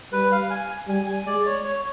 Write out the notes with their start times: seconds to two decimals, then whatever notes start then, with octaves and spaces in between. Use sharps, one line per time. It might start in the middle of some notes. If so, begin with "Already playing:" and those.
0.12 G3 B4
0.32 F5
0.50 G#5
0.88 G3 G#5
1.07 G#5
1.26 G#3 D5
1.46 C#5
1.64 C#5